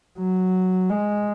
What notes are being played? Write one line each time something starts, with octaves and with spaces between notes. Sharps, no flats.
F#3
G#3